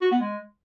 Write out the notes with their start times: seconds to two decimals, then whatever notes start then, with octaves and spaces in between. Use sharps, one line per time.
0.01 F#4
0.11 B3
0.21 G#3